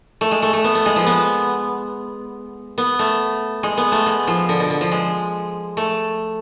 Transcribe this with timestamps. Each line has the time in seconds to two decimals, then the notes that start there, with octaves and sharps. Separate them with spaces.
0.21 A3
0.31 G#3
0.42 A3
0.53 A3
0.64 B3
0.75 A3
0.86 G#3
0.96 F3
1.06 B3
2.78 B3
2.99 A3
3.63 G#3
3.77 B3
3.92 A3
4.06 G#3
4.27 F3
4.49 D3
4.59 B2
4.70 D3
4.81 F3
4.92 G#3
5.77 A3